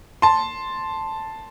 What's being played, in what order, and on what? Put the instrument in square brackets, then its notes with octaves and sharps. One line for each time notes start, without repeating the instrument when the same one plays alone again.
[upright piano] A5 C6